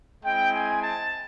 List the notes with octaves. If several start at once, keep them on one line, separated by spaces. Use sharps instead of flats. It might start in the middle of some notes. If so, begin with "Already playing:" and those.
G#3 C4 E4 G5
G#5
A5